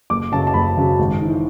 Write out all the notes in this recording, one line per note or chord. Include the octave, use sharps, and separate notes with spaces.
F#1 D6
F#2 C#3 F#3 A5
A5
F#1 B5
F#2 C#3 F#3
G#1
G#2 E3